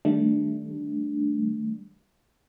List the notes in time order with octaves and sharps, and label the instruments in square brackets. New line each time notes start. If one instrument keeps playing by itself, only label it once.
[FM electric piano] D#3 G3 A3 D4